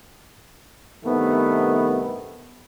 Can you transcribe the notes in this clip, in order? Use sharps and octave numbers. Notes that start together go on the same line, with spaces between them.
G2 C3 D#3 A3 B3